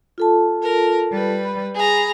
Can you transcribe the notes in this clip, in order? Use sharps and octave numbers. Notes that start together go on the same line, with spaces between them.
F4 A4 A5
A#4
G3 B4
B5
G#4 A#5